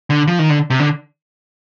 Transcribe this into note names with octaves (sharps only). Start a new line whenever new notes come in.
D3
F3
D#3
D3
C3
D3